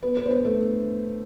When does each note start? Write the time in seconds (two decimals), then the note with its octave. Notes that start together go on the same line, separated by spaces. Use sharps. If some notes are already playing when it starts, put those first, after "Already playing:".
0.03 B3 B4
0.17 B3 B4
0.26 C5
0.30 B3 B4
0.45 A3 A4